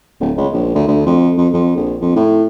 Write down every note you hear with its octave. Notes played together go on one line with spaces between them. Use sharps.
D1
C#2
A#1
D2
D2
F2
F2
F2
A#1
F2
A2